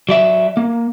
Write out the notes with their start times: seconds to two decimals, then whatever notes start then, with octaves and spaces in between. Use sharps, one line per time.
0.09 F#3 D5 E5
0.57 A#3